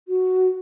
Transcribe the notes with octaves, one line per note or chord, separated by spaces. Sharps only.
F#4